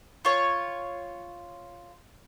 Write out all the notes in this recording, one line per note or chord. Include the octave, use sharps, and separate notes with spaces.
F4 C#5